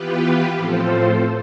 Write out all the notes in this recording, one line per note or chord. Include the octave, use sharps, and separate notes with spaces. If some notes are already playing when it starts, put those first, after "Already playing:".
Already playing: E3 B3 F4 G4 B4
A2 F3 C4 F4 A4 C5